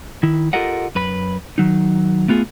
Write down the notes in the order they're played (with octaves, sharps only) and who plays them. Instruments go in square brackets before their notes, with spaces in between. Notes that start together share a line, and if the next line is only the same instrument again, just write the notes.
[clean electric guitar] D#3 E4
F4 G4 A4 A#4 D#5 F#5
F#2 B4 B5
D#3 F#3 D#4
A3 B3 F4 F#4 G#4